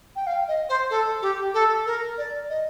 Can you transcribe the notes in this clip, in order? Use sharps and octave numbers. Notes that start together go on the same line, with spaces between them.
G5
F5
D#5
C5
A4
G4
A4
A#4
D5
D#5